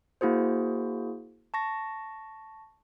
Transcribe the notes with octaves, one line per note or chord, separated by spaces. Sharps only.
A#3 E4 F#4 G#4 C5
A5 C#6 A#6